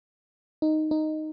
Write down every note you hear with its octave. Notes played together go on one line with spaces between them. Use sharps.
D#4
D#4